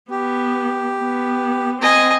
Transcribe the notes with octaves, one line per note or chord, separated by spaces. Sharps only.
B3 G4
B3
C4 D#5 G#5